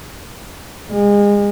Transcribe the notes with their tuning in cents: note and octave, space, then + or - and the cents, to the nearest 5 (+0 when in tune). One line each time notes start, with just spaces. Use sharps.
G#3 -30